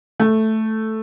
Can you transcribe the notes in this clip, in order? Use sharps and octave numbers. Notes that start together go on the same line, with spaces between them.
A3